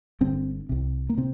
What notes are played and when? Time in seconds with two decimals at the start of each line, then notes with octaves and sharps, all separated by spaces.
0.21 G1 G2 D3 C4
0.69 C2 C3
1.09 A#3
1.17 C3 C4